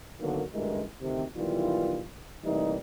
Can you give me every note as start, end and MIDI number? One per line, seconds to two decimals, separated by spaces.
0.20 0.43 50
0.20 0.43 51
0.20 0.43 54
0.20 0.43 58
0.20 0.43 59
0.20 0.43 66
0.53 0.83 33
0.53 0.83 38
0.53 0.83 43
0.53 0.83 56
0.53 0.83 64
0.53 0.83 70
1.01 1.24 38
1.01 1.24 48
1.01 1.24 51
1.36 2.03 35
1.36 2.03 51
1.36 2.03 52
1.36 2.03 55
1.36 2.03 65
2.45 2.76 48
2.45 2.76 52
2.45 2.76 55
2.45 2.76 57
2.45 2.76 58
2.45 2.76 63